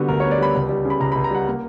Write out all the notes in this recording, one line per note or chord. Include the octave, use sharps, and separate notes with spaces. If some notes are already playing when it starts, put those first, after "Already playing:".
Already playing: D3 G3 B3 F#4
D2 A#4
C#5
B3
D5
G3 B5
C#2
G3
C#3 B5
C#2 A#5
B5
C#2
A#5
G3 F#5
A#3